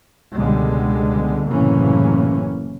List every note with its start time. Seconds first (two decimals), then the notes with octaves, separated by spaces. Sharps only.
0.37 C#2 B2 D3 G3 G#3
1.50 F#1 A2 C3 E3 A#3 C#4